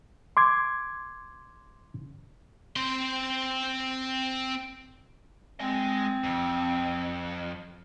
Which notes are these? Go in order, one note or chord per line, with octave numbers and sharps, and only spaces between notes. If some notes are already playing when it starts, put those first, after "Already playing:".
C6 D6 G#6
C4 C6
G#3 C4 G#5
F2